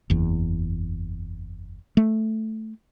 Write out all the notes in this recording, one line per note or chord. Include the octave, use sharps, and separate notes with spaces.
F#1 E2
A3